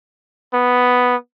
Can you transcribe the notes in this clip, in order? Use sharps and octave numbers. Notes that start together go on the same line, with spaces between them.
B3